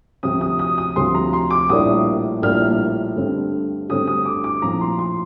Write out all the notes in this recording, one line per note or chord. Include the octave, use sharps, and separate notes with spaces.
D2 C3 F3 C4 D#6
D#6
D#6
D#6
D2 C3 F3 C4 C6
A#5
C6
D6
A#1 A2 G3 A#3 D4 D#6
A#1 A2 G3 A#3 D4 F6
G2 D3 A3 C4
G2 D3 A3 C4 D#6
D#6
D6
D6
A#1 A2 F3 C4 A#5
C6
C6